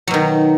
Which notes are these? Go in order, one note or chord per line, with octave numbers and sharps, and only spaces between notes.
B2 D#3 F#3